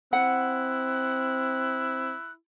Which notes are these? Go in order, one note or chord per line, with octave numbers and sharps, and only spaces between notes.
C4 E4 F#5 F#6